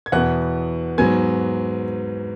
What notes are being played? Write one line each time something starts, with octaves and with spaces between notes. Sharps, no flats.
G#6
E2 B2 B3 F#5 F#6
G#2 F#3 B3 G#5 G#6